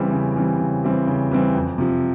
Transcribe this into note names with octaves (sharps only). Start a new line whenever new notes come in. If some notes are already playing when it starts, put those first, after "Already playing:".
Already playing: C#3 E3 G3 C4
C#3
E3 G3 C4
C#3
E3 G3 C4
C#3
E3 G3 C4
F2
C3 F3